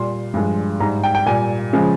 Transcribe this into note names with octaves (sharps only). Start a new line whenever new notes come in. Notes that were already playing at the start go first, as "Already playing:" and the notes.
Already playing: A#2 G3 C6
G2 F3 G#3
G#2 G3 A#5
G5
G5
A#2 G3 G#5
C#3 F3 G#3